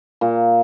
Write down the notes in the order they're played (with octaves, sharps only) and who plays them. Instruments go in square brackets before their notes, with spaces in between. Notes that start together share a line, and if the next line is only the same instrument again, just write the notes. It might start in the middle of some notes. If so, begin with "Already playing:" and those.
[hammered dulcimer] A#2